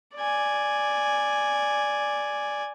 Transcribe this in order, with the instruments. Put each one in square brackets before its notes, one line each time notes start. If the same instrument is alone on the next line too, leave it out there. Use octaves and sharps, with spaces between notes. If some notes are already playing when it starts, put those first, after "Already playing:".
[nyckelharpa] D5 G#5